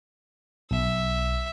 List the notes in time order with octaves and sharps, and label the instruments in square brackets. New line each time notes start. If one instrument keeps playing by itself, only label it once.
[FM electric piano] B1 [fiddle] E5